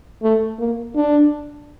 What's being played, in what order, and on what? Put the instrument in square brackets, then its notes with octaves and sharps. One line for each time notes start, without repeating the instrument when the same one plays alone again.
[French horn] A3
A#3
D4